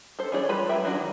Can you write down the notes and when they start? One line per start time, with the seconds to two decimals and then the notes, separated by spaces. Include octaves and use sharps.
0.19 A4 C5
0.32 E3 D4 G#4 C#5 D5
0.49 G3 G#3 F4 B4 B5
0.69 F#3 E5 G5
0.84 E3 F#3 C#4 D4 F#4
0.95 D#3